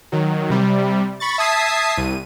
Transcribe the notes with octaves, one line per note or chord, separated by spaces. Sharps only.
D#3 F#3
C3 G3
B5 C#6 A6
E5 A5 D#6 G#6 B6 C7
C2 D#7